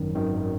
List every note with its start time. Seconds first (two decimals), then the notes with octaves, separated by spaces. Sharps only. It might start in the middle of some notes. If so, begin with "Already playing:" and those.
Already playing: G#1 F#2 D#3
0.15 G#1 F#2 D#3